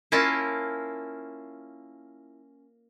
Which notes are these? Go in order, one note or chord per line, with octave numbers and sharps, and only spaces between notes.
A#3 C#4 E4 F4 A5